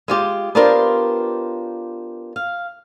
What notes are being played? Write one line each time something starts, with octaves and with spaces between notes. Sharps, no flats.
G#3 F4 G4
B3 D4 F4 G4 A#4 C5
F5